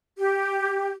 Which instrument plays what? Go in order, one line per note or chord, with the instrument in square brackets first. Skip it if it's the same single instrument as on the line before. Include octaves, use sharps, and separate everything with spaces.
[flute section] G4